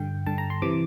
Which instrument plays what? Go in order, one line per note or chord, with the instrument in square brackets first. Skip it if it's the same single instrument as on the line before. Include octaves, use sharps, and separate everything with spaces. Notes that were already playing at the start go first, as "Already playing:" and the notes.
Already playing: [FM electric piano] G2 D3 G5
G2 D3 A5
A#5
C6
C3 E3 D6